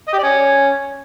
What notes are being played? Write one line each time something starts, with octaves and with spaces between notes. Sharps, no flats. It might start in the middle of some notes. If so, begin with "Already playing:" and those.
D#5
G4
D5
C#4